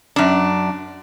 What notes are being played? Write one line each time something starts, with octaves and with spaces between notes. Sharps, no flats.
F#2 D4